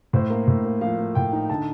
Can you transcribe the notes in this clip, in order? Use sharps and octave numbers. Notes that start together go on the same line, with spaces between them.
A2 C5
A#3
A2
A#3
F3 F5
A#3
A2 G5
D#4
D3 A5